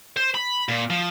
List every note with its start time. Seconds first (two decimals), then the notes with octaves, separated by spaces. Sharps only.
0.16 C5
0.34 B5
0.69 A#2
0.90 F3